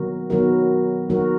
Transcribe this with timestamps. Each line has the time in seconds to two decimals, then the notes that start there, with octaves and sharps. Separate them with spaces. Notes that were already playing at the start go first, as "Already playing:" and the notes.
Already playing: D#3 F#3 B3 F#4 A#4
0.30 D#3 F#3 B3 F#4 A#4
1.09 D#3 F#3 B3 F#4 A#4